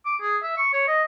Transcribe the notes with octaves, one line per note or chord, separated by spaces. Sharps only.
D6
G#4
E5
C#6
C#5
D#5